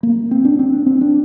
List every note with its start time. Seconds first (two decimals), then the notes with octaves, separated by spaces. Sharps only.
0.03 A#3
0.31 C4
0.45 D4
0.59 C4
0.73 D4
0.86 C4
1.01 D4